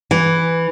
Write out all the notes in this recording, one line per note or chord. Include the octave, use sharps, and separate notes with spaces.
E3